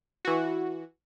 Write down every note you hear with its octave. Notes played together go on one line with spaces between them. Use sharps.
E3 F#4